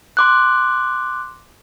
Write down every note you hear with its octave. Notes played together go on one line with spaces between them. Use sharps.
C6 D6 F#6